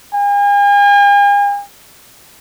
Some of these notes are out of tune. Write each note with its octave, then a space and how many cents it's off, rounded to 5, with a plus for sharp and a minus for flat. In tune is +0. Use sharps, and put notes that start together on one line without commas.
G#5 -45